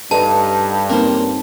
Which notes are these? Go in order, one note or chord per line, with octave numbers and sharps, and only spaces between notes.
G2 D#4 A4 B4 A5
A#3 C4 C#4 D#4 C5